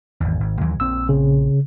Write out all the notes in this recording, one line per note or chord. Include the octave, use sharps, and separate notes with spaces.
G#1 E2
G#1
D#2 E3 F#3
A#1 A#2 C4 E6
C#3